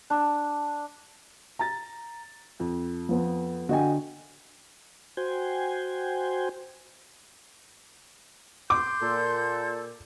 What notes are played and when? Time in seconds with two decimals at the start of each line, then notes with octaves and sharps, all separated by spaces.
0.10 D4
1.59 A#5 A6
2.60 F2
3.09 F3 B3
3.69 D3 F#4 D#5 G5 G#5
5.17 F#4 C5 G5 G#5
8.70 C6 D6 G6
9.02 A#2 A4